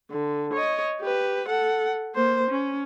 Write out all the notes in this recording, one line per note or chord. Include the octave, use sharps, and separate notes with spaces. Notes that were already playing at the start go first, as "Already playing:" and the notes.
D3
C#5 D#5
G4 B4
A4 F#5
A#3 C5
C#4